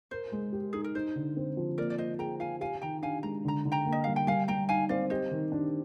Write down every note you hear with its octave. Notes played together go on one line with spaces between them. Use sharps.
A#4 C5
G#3
G4
D#4 G#4
A#4
D#4 C5
D3
C4
F3
A#3 A#4 D5
D5
A#3 C5 D#5
G#4 G5 A#5
F4 F5 G#5
G4 F5 G#5
D#3 G5 A#5
D4 F5 G#5
G#3 A#5
D3 A#5
D3
G5 A#5
A#3
D#5
G3 F5
G5
G3 F5 G#5
G3 G5 A#5
D#4 F5 G#5
C4 D5 F5
G4 C5 D#5
D#3
D4